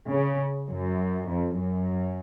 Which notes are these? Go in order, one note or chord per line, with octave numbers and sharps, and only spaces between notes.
C#3
F#2
F2
F#2